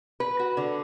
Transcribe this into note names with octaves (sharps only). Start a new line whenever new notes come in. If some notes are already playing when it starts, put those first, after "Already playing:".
B4
F#4
D3